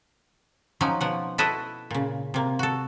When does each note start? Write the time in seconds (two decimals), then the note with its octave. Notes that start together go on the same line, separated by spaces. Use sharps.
0.81 F3 F#3 C#4 D#4
1.01 B2 F3 F#5
1.38 E4 F#4 A4 B4 D#5 E5
1.91 A#2 C#3
2.34 C3 A#3
2.59 F#4 A4